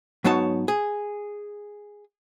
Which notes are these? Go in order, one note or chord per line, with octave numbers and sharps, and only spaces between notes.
G#2 F#3 B3 D#4 C#5 A5
G#4